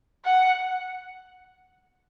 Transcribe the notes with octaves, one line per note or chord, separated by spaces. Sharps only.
F#5